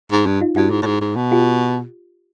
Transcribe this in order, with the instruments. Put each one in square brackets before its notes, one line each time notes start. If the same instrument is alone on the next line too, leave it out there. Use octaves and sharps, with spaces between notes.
[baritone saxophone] G#2
G2
[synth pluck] D#4 F4
[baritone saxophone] G2 [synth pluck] E4 F#4
[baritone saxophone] G#2
A2
G#2
G#2
B2
[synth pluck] F4 G4